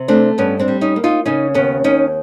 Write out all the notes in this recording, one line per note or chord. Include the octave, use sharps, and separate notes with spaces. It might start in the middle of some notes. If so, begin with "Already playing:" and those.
Already playing: C3
A3 C4 D4
G2 B3 C#4
C4 D4
G3
C#4 D#4
A#3
D#4 F4
C#3 C#4 D#4
D#2 B3 C#4
D#2 C#4 D#4